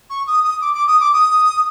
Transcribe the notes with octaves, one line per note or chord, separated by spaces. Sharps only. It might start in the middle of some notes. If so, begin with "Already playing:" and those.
C#6
D#6
D#6
D6
D6
D#6
D6
D#6